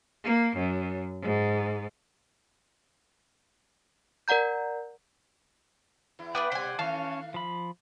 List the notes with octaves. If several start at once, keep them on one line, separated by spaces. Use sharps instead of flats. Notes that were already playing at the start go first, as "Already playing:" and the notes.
A#3
F#2
G#2
A#4 D5 F#5 A#5 G6
E2 E4
B3 D4 B4 D5 F#5 G5
B2 G3 C5 G#5
D#3 A3 C#4 C#5 F5 A5
F3 B5